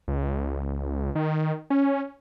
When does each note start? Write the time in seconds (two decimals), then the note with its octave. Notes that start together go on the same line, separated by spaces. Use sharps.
0.08 C#2
1.15 D#3
1.70 C#4